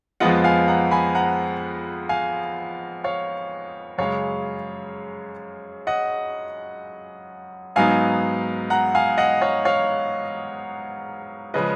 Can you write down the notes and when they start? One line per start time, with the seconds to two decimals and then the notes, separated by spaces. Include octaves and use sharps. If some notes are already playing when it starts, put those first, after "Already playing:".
0.20 F2 F3 G#3 B3 F4 D#5 F#5
0.44 F5 G#5
0.68 F#5 A#5
0.91 G#5 B5
1.15 F#5 A#5
2.09 F5 G#5
3.04 C#5 F5
3.98 F#2 C#3 G#3 C#5 F5
5.87 D#5 F#5
7.76 G#2 F#3 B3 D#4 F5 G#5
8.70 F#5 A#5
8.95 F5 G#5
9.18 D#5 F#5
9.42 C#5 F5
9.65 C#5 F5
11.54 C#3 F3 G#3 B4 D#5